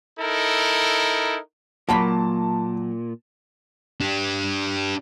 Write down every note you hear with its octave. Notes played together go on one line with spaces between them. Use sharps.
D#4 E4 A4 A#4
A#2 F#3 A#3 A5 B5
D4 G4